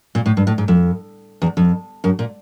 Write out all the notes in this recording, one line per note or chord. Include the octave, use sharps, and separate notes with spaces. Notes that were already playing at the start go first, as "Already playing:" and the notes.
A#2
A2
G2
A2
G#2
F2
E2
F2
F#2
A#2